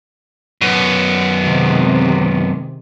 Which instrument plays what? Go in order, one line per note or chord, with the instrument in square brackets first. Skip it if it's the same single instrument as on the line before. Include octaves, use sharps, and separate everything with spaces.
[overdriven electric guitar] F#2 B3
[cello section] C3 D#3 G#3